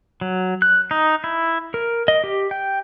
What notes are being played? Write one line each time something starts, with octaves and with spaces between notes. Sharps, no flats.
F#3
F#6
D#4
E4
A#4
D#5
G4
G5